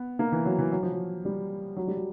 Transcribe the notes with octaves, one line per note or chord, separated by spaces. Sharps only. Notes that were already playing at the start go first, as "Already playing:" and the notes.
Already playing: B3
A#3
E3
F#3
E3
F#3
F3
F#3
G3
F#3
G3
F#3